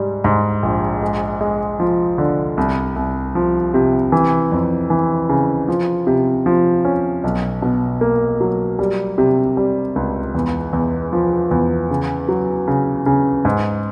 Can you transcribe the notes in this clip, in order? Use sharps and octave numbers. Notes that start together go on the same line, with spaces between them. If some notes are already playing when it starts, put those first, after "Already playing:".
Already playing: G#2 G3
G#2
A#1
G#3
G#3
F3
D3
C2
C2
F3
C3
E3
F2
E3
C#3
F3
C3
F3
C#4
B1
B2
A#3
F#3
G3
C3
G3
C#2
E2
E2
F3
E2
C#3
F#3
C#3
C#3
G#2